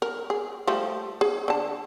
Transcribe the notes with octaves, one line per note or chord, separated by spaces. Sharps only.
A#4
G#4
F3 G3 A3
G#4
D3 A5